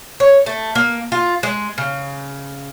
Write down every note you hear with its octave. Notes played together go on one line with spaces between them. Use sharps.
C#5
A3
A#3
F4
G#3
C#3